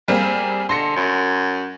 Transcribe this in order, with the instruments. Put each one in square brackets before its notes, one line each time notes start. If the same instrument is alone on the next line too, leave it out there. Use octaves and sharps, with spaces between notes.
[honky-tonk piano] G3 A#3 C4 [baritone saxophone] G#4
[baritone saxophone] D3 [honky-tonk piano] C6 A#6 C#7
[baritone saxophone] F#2